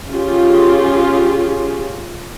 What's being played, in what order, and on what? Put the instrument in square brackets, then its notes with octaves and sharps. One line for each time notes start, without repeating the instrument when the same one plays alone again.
[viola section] C#4 F4 G4 G#4